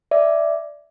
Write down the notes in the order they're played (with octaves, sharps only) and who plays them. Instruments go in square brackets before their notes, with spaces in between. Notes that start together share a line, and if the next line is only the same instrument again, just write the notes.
[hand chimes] D5 E5